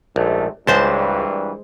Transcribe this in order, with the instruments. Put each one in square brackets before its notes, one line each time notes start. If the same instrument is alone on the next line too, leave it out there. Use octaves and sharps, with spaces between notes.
[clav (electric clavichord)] A#1 [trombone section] G#2 C3 A3
[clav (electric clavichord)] C#2 [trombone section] G2 A#2 E3 [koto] G#3 C5 A5